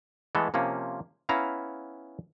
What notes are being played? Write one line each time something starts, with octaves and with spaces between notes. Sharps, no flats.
E3 G#3 A3 B3 A4
C3 F3 A#3 C#4
B3 C#4 E4 F5 A#5